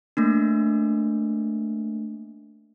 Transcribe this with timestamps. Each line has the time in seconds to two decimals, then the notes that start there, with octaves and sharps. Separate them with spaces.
0.17 A3 A#3 D4